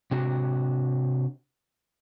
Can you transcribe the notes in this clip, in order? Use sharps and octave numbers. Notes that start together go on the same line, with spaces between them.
C3 D4 F#4